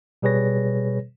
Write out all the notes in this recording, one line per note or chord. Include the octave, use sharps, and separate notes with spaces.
B2 G3 G#4 B4 C#5 A#6